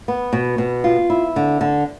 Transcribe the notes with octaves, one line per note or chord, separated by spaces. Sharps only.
B3
B2
B2
F4
E4
D3
D3